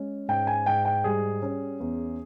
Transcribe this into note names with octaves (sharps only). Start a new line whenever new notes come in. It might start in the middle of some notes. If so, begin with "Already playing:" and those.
Already playing: G#3 C#4
G#2 G5
G#5
G#2 G5
G5
G3 G#4
C#4
E2